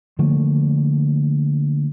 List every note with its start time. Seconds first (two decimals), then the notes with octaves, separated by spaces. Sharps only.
0.19 D3 F3 A3 A#3